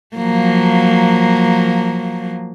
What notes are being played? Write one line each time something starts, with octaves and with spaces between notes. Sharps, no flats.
F3 F#3 A#3